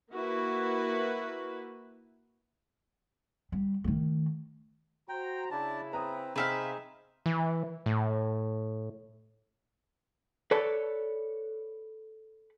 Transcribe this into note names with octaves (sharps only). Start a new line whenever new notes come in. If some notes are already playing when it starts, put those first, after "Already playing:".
A#3 E4 F#4 B4
G3
D#3 A3
F#4 C5 G5 A#5
C#3 D4 E4 A5
C4 B4 A#5 D#6
C3 C4 D#4 G#4 B4 E5 F5
E3
A2
A4 B4 C#5 D5 A5